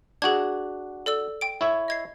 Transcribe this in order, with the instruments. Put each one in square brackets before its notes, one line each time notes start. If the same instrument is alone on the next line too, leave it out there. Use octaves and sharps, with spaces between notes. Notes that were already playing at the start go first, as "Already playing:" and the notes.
[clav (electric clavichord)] D4 F#4 [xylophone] G#4 G#6
[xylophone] A4 D5 E6
G5 D7
[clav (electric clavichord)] E4 C#5 E5
[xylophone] D#5 G#6 C7